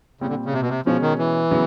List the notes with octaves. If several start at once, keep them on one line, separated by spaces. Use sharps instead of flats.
A#2 C#3 G3 C4
D3
C#3
C3
B2
C3
B2 F3 G#3 C#4
D#3
E3
C#3 F#3 B3